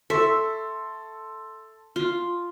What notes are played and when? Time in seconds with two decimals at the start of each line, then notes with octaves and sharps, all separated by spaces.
0.10 A4 E5 C6 C#6
1.96 F4